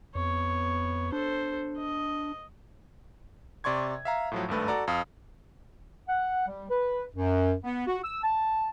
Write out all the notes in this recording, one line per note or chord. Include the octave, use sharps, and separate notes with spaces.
F2 B3 C#5
D4 A4 C5
D#5
C3 D5 C6 C#6 G#6
E5 F5 A#5
A2 F3 F#3
G#1 G2 A3 B4
F#4 A4 D5 A#5
F2 F5 D#6
F#5
G3
B4
F#2
B3
F#4
E6
A5